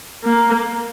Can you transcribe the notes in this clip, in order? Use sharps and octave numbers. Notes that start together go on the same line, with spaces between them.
A#3